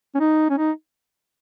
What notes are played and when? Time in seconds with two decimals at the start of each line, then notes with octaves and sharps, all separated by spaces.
0.15 C#4
0.20 D#4
0.50 C#4
0.58 D#4